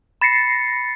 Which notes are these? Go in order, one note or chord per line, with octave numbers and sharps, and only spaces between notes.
B5 A6 A#6 C7 C#7